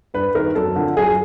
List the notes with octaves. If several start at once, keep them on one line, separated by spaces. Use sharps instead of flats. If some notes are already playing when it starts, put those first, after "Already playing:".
G2 B4
D#3 A#4
F#2 A4
D3 F3
F#2 G#4